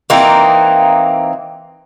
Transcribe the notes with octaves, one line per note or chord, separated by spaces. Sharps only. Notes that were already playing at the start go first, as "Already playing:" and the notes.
E3 A#3 C4 D#4